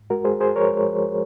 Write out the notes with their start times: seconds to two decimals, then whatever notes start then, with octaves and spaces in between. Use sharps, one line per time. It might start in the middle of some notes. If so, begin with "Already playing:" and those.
Already playing: G#2
0.10 G#3 F#4 A#4
0.25 G#3 G#4 C5
0.40 G#3 G#4 C5
0.56 F3 A#4 C#5
0.71 G#3
0.87 F3